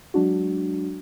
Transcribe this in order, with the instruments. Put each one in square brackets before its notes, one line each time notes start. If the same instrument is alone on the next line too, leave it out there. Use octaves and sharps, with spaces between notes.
[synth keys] F#3 G#3 D4 F#4